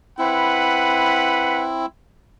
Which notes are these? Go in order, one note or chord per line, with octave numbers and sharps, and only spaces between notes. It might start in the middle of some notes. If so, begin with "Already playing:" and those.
C4 E4 B4 F#5 B5